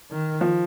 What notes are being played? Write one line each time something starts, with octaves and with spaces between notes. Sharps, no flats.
D#3
F3